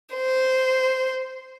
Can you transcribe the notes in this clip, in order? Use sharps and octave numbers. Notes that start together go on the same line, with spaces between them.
C5